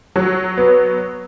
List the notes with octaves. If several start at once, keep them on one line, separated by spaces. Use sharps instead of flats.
F#3
B3